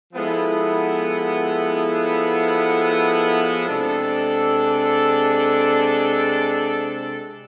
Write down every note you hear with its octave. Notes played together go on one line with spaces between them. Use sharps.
F3 G#3 B3 E4 A4
C3 G#3 D4 A4